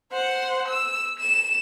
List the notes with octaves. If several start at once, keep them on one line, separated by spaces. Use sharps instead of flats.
C5 F#5
E6
E7